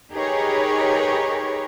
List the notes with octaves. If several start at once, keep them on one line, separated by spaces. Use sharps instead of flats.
D#4 G4 G#4 A#4 B4 C#5